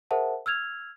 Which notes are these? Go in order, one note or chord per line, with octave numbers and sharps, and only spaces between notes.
G#4 A#4 C5 E5 F#5 A5
E6 F6 G#6 F7